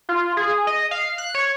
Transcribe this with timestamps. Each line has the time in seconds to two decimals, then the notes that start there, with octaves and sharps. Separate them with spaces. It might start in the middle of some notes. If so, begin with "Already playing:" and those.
0.09 F4
0.37 G#4
0.67 D#5
0.91 F5
1.18 F#6
1.35 C#5